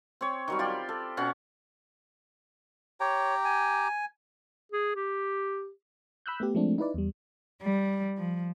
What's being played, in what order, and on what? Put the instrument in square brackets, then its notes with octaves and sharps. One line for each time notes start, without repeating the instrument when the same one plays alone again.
[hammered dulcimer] C4 C#5
D#3 F#3 G3
F4 G4 D5
A4
B2 C#4 F#5
[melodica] G4 G5 A#5 [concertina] C#5
[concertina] G#5
[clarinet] G#4
G4
[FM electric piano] B5 E6 F#6 G6
A3 B3 G4
F3 G#3 A3 C4 D4
D#4 E4 B4 D5
E2 G3
[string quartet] G3
F3